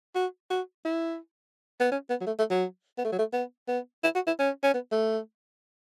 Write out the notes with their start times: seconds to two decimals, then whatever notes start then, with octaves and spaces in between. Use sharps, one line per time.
0.15 F#4
0.50 F#4
0.85 E4
1.80 B3
1.92 C#4
2.10 B3
2.21 F#3
2.27 A3
2.39 A3
2.50 F#3
2.98 B3
3.05 A3
3.12 F#3
3.19 A3
3.33 B3
3.68 B3
4.04 E4
4.15 F#4
4.27 E4
4.39 C#4
4.63 C#4
4.74 B3
4.92 A3